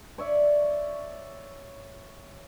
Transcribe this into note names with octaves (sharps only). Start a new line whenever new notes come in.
C#5 D5 E5